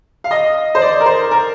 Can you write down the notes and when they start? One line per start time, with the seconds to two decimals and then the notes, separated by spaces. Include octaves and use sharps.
0.24 F5
0.31 D#5
0.75 C5
0.82 D5
1.00 A#4
1.06 C5
1.31 A#4